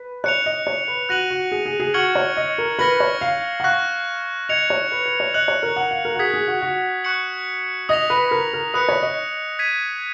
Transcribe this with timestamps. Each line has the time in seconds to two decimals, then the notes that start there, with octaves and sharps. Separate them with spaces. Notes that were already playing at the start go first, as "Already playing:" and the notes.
Already playing: B4
0.24 C#5 F#6 C#7 F7
0.46 D#5
0.67 C#5
0.88 B4
1.09 F#4 F#6 A#6 D#7 F#7
1.30 F#4
1.52 G#4
1.66 G#4
1.80 G#4
1.94 F#4 C#6 F6 G#6 C#7 F#7
2.15 C#5
2.37 D#5
2.58 A#4
2.79 B4 F6 A#6 C#7 F#7
3.00 C#5
3.21 F5
3.60 F#5
3.64 F5 C#6 F#6 A#6
4.49 D#5 G#6 C#7 F7
4.70 C#5
4.92 B4
5.06 B4
5.20 C#5
5.34 D#5 F#6 C#7 F#7
5.48 C#5
5.63 A#4
5.76 F#5
5.91 F5
6.05 A#4
6.15 F#4
6.19 G#4 D#6 G#6 B6
6.34 G#4
6.48 F#4
6.62 F#4
7.04 C#6 F#6 C#7 F#7
7.89 D#5 D#6 A#6 F7
8.10 B4
8.31 A#4
8.53 A#4
8.74 B4 D#6 F#6 C#7
8.89 C#5
9.02 D#5
9.59 G#6 B6 D#7